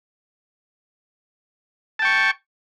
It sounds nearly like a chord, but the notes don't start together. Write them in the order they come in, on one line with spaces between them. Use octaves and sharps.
A5 G5 C#6